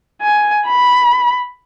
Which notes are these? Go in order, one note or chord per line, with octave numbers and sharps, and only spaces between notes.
G#5
B5